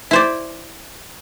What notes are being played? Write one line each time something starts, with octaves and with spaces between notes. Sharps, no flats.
E4 C5 D5